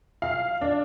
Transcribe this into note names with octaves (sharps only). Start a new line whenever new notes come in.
F5
D4